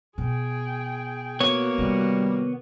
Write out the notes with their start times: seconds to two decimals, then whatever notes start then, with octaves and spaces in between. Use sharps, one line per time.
0.18 B2 G#4 G5
1.40 A#3 B3 F#4 C#5
1.78 C3 D#3 G3